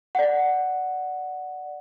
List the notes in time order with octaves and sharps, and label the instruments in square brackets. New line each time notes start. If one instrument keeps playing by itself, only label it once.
[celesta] D5 F#5